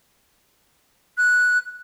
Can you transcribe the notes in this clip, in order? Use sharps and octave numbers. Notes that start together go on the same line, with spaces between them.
F#6